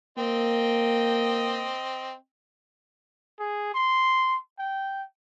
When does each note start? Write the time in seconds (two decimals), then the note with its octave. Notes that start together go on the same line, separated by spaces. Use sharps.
0.18 A#3 C4 D#5 G5
3.40 G#4
3.74 C6
4.59 G5